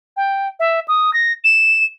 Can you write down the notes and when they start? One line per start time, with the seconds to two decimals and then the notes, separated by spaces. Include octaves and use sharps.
0.17 G5
0.60 E5
0.88 D#6
1.13 A#6
1.44 E7